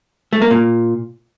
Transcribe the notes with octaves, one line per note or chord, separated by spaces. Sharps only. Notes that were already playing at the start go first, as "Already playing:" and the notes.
A3
A#3
A#2